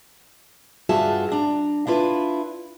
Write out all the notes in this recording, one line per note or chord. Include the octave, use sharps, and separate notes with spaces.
G2 F4 F#4 G#4 E5 A5
D4 A#5
D4 E4 F4 B4